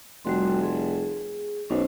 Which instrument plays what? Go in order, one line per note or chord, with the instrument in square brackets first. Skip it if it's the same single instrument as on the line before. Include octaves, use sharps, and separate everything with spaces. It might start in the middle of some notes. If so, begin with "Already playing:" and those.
[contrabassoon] F1 [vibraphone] G3 F#4 C6
[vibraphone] G#4
[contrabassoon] B1 [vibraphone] C#4 C5